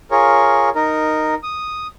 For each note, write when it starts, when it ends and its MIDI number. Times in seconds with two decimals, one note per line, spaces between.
0.11 0.69 65
0.11 0.69 68
0.11 0.69 70
0.11 0.69 73
0.75 1.35 63
0.75 1.35 70
1.43 1.87 87